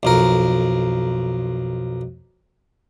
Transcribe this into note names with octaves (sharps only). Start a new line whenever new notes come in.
B1 F2 A#4